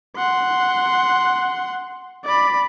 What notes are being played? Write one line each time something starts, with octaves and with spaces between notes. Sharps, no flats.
F#5 C6
D5 B5